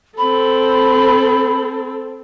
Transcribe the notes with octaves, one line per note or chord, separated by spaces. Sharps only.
C4 A4 B5